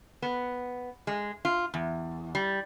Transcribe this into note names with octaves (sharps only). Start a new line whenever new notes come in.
B3
G#3
F4
E2
G3